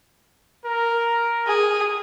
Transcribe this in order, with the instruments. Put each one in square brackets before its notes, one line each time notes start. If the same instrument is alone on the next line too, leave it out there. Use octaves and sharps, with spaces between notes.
[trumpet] A#4
[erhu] G#4